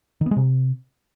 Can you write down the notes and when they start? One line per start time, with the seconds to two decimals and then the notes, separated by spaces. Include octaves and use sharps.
0.21 D#3
0.26 B3
0.31 G#3
0.36 C3